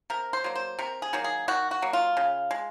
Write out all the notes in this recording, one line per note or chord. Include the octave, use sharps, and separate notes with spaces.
C3 A#4
C5
F#3 A#3
C5
C3 A#4
G#4
D#3 F#3 A#3
G#4
D#3 F#4
F#4
F#3 A#3
F4
C#3
G#3